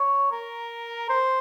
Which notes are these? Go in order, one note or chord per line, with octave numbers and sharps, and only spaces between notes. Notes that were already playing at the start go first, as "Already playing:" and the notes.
Already playing: C#5
A#4
C5